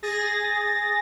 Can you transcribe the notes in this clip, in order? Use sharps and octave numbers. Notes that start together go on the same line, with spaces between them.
G#4 A6 A#6